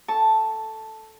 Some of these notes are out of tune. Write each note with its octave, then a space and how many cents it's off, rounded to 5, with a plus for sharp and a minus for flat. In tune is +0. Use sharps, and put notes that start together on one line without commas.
A4 +0 A5 +0 C#6 +0